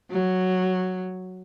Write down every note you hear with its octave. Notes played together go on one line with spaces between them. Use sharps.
F#3